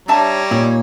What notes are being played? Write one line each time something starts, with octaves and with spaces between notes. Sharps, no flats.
G3 D4 C#5 E5 A5 A#5
A#2 D#4